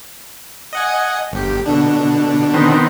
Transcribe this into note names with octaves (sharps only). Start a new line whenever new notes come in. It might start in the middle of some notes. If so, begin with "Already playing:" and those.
D#5 F#5 G#5
G1 G4
B2 D3 D4
D#3 B3 C4